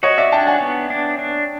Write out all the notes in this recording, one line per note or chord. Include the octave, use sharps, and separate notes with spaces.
F#4 C#5 D#5
D5 E5
D4 G5 A5
F#5 G#5
B3
D4
D4